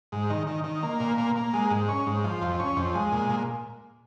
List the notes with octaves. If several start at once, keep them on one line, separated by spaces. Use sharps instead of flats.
G#2
D#3
D#3
D#3
A#3
A#2
A#3
A#3
G#3
G#2
C#4
G#2
F3
F2
C#4
F2
G#3
A#2
A#2